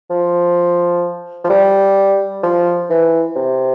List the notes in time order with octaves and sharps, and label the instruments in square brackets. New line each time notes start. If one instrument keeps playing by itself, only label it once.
[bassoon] F3
F3
G3
F3
E3
C3